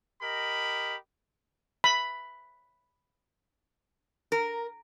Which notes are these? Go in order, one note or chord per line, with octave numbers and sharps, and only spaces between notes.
G4 A#4 D#5 B5
B5
A#4